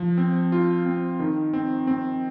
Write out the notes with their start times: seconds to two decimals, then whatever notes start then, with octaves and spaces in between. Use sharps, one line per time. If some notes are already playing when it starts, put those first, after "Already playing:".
Already playing: F3
0.18 C4
0.52 F4
0.86 C4
1.20 D#3
1.53 C4
1.87 C4